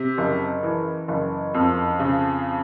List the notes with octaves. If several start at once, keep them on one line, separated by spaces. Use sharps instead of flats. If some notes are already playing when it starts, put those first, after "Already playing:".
Already playing: C3
F#1
E3
F#1
F2
C#3